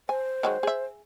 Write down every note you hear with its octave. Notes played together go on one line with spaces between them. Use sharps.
C5 G#5
D#3 F#3 G#3
G#4 E5